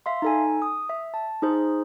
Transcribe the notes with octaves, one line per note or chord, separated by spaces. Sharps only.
E5 F5 C6
D#4 A4 G#5
D#6
E5
A5
D#4 G#4 C5